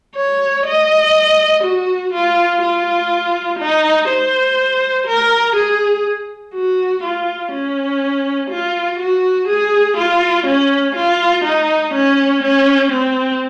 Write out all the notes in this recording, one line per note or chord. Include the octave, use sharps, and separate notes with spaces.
C#5
D#5
F#4
F4
F4
D#4
C5
A#4
G#4
F#4
F4
C#4
F4
F#4
G#4
F4
C#4
F4
D#4
C#4
C#4
C4